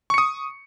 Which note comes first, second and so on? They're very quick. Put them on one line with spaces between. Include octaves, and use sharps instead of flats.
C#6 C#7 D#6